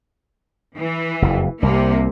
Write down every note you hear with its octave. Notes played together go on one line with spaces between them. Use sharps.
E3
F#1 F2
C2 C3 A#3